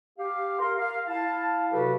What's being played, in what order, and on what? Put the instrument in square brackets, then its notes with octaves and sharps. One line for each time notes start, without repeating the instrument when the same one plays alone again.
[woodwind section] G4 F5
A#4 C6
F5
E4 F5 A5
C3 F#3 F#4 G4 A4 B4